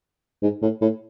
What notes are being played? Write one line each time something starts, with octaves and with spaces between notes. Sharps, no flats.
G#2
A2
A2